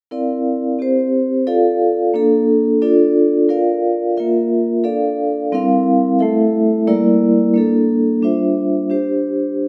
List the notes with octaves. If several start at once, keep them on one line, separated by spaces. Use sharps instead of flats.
C4 E4 A#4 D5 F5
C4 G4 C5
F4 A4 D5 F5
A#3 D4 A4
D4 F4 A4 D5
F4 A#4 D5 F5
A#3 F4 A#4 E5
D4 A4 D5 F5
G3 C4 E4 A#4 F5
A3 E4 A4 E5
G3 A#3 E4 A#4 D5
A#3 D4 A4
G3 D4 F4 C5 E5
D4 G4 C5